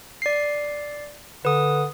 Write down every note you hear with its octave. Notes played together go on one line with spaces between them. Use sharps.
D5 C7
D3 B4 D#6